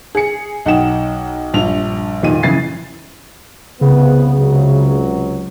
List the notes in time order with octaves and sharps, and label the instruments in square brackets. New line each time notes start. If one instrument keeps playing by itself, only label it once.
[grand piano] G#4 C#7
B1 D#4 F#5 G5 E7
A#1 G2 F7
F1 A#2 D#3 D#7
C#3 E3 A6 C7
[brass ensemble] C2 B3 [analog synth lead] C#3
[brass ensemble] C#2 C3 F#3